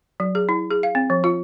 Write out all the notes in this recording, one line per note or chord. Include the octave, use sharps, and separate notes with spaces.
F#3
G#4
E4
G#4
F5
C4
F3
F4